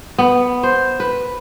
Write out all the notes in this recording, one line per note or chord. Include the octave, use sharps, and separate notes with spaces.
B3
C5
B4